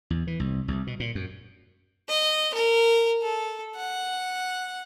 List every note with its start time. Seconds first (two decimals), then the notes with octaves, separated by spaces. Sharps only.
0.10 E2
0.27 E3
0.40 C2
0.68 C2
0.87 B2
1.00 A#2
1.15 F#2
2.09 D#5
2.54 A#4
3.22 A4
3.76 F#5